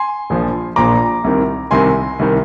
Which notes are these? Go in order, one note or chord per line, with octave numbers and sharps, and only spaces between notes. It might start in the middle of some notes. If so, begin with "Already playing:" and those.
Already playing: G#5 C6
A#1 A#2 F3
A#1 A#2 F3 A#5 D6
C2 C3 D#3
C2 C3 D#3 G#5 C6
C2 C3 D#3